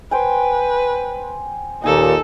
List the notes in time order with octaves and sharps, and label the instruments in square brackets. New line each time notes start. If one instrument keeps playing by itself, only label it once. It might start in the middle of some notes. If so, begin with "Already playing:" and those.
[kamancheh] B4 [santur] C5 G5 G#5
[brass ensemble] D#2 A#2 [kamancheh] D#4 A4 [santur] G#5